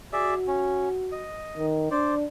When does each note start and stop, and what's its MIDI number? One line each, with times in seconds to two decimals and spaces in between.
0.13 1.28 66
0.13 0.34 68
0.13 0.34 74
0.13 0.34 76
0.47 0.89 61
1.12 1.66 75
1.57 1.91 51
1.91 2.26 62
1.91 2.15 72
1.91 2.15 74